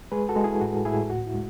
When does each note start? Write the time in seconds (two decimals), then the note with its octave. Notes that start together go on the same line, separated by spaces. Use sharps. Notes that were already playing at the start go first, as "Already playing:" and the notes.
0.12 G#3 G#4 B4
0.29 F#4 A4
0.36 G#3
0.44 E4 G#4
0.61 A2 F#4
0.85 A2 E4 G#4
1.10 D2 F#4
1.26 E4
1.34 G#3